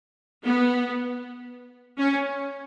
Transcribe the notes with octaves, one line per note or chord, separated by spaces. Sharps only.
B3
C#4